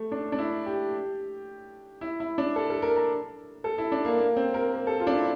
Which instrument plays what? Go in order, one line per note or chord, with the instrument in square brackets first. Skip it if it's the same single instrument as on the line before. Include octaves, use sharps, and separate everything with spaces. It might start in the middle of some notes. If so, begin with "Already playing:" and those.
Already playing: [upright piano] A3
D4
D4
E4
G4
E4
E4
D4
A4
A4
A#4
A#4
A4
E4
D4
A#3
A#3
C4
A#4
A#4
A4
F4
D4
E4